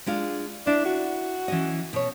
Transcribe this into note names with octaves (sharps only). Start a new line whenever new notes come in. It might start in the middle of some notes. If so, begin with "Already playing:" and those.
G#3 D4 F4
D4 E4
F#4
E3 C#4 D#5
B2 C#5